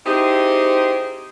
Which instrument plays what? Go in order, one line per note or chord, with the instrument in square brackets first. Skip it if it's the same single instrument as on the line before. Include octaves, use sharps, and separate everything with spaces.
[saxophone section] C4 D#4 E4 G4 G#4 C5